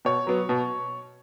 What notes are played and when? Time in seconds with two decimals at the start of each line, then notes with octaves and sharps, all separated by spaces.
0.05 B2 C#5
0.27 F#3 B3
0.49 B2